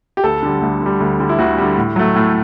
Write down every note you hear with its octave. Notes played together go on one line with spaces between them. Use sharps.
G4
D2 A4
D3 G3
D2
D3 G3
D2
D3 G3
E4
D2 F#4
D3 G3
A2
F#3 A3
A2